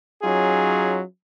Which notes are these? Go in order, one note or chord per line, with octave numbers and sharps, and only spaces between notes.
F#3 C#4 D#4 F4 G#4